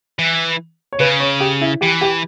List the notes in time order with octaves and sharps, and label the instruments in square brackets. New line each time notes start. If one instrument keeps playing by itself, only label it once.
[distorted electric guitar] E3
[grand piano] C#5
[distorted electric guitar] C#3 [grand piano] B4
[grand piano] C#5
G4
E4
[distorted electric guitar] E3 [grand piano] G4
[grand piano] G4